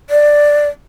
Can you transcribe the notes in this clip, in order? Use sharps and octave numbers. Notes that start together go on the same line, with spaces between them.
D5